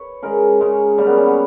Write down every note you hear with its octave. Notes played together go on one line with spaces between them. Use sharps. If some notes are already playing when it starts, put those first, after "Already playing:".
Already playing: B4 C#5
C#3 G#3 A#4
C#3 G#3 C#4
C#3 G3 A#3 C#4
B3
C#4
B3